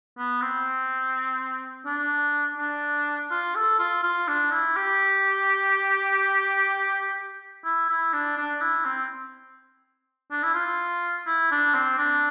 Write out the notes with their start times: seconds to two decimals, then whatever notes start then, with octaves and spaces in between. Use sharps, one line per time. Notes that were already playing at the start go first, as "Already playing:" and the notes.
0.18 B3
0.41 C4
1.86 D4
2.58 D4
3.31 F4
3.55 A4
3.79 F4
4.03 F4
4.28 D4
4.51 E4
4.76 G4
7.64 E4
7.89 E4
8.13 D4
8.37 D4
8.61 E4
8.85 C4
10.31 D4
10.43 E4
10.54 F4
11.26 E4
11.51 D4
11.74 C4
11.98 D4